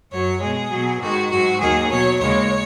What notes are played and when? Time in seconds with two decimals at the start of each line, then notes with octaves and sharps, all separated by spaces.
0.11 F#2 F#3 C#5
0.42 B2 G#3 G#4
0.70 B2 F#3
1.00 G#2 D#3 G#3 F#4
1.30 G#2 F#3 F#4
1.60 D#2 D#3 F#3 G#4
1.89 B2 F#3 C#5
2.19 D#2 C#3 G#3 C#5